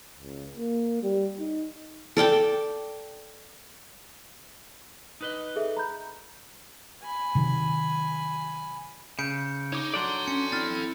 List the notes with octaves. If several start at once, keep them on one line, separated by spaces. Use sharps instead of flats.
C#2
A#3
G3
D#4
A4 D5 G5 A5
D#4 B4 D#5
G#4 A4 E5
A#5 B5 G6
G#5 B5
C3 D#3 F#3
C#3 G6 C#7 D7
D#4 C#5 D6
F#3 D4 A4 D5 C6
C#4 C#7
C4 E4 F6 A6